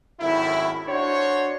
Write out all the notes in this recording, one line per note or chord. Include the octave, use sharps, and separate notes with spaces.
G#1 F#2 A2 E4
D4 F#4 C5 C#5